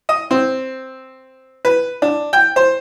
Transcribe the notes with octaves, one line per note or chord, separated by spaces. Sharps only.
D#5
C4
B4
D4
G5
C5